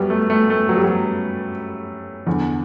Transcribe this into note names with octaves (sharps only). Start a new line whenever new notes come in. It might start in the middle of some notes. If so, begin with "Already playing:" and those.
Already playing: F#2 F#3 G3 B3
A3
A3
A3
F#3
G3
F#3
E2 D3